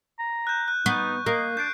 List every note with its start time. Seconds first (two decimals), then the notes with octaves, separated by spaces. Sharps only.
0.19 A#5
0.47 F#6 G6
0.68 F#6
0.86 B3 D#4 C#6
1.26 A#3 D#5 C7
1.57 D4 G6 C7 D7